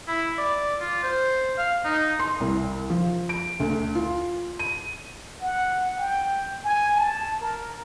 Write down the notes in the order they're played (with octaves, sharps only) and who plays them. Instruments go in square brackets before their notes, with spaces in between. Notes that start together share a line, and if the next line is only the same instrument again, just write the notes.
[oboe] E4
D5
F4
C5
F5
D#4
[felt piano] C6
C2
F3
D7
D2
F4
D#7
[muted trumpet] F#5
G5
G#5
A5
A#4